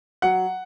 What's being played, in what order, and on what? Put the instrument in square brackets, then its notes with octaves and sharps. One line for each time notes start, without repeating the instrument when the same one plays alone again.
[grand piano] F#3 F#5